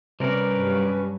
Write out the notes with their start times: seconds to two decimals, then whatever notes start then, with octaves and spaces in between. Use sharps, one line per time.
0.20 C3 G3 C#4 A#4 B4 D5
0.54 G2 F#3